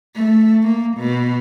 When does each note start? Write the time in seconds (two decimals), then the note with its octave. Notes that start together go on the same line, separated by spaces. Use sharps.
0.16 A3
0.63 A#3
0.98 B2